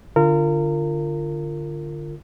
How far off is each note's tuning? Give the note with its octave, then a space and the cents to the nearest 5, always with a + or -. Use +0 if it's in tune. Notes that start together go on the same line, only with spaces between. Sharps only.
D3 +0 F4 -20 A#4 -30